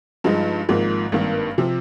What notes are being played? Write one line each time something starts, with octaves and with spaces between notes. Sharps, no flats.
G2 F3 G#3 D#4
G#1 G#2 F3 A#3
G#1 G2 D#3 A#3
C3 F3 C4